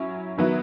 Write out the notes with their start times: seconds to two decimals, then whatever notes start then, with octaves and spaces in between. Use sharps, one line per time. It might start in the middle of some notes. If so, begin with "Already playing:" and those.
Already playing: F#3 C#4 E4
0.37 D#3 F#3 B3 E4